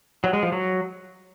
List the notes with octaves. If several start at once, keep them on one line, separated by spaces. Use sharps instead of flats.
F#3
G#3
F3
F#3